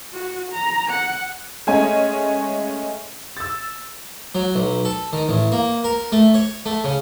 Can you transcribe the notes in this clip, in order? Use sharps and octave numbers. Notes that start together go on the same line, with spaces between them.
F#4
A#5
F#5
G#3 A3 C#4 G#5
E6 A6
F#3
B1
A4
D#3
A1
A#3
A#4
A3
C#5
A3
C#3